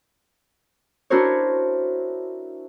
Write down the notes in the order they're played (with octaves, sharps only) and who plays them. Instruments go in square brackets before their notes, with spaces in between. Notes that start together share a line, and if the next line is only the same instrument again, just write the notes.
[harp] D4 E4 F#4 A#4 C5 C#5